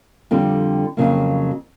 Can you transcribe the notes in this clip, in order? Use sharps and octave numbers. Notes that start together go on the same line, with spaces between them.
F2 D3 G3 C4
F2 C#3 F#3 A#3